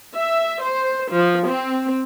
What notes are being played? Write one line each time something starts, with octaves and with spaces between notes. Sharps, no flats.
E5
C5
F3
C4